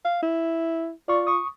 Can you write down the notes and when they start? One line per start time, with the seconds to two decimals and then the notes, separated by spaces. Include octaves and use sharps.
0.05 F5
0.23 E4
1.08 F4 D5 C#6
1.27 C#6 D#6